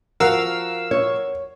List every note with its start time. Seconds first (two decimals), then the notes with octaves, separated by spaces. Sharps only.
0.20 F3 F#4 A#4 F5 F#5 E6
0.91 C#5